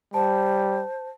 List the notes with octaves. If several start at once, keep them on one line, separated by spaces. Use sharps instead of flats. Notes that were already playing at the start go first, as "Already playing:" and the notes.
G3 C5 A5